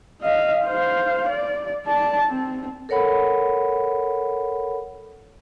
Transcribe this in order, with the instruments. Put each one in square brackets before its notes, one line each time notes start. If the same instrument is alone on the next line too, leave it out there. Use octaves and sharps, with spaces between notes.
[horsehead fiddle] D#5 F5
C5 F5
D5
D5 A5
C4
[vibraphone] A4 A#4 C#5 F#5 B5